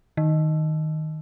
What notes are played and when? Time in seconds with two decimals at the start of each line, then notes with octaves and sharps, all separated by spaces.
0.17 D#3